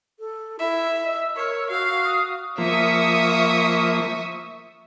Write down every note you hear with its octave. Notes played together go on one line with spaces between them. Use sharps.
A4
E4 E5
D#5 E6
A#4 C#5
F#4 F5
D#6
F3 A#3 E5 C#6 D#6